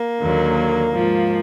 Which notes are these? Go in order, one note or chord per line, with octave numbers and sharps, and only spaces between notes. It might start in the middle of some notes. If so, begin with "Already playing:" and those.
Already playing: A#3
D#2 D3 F#3
G#2 F3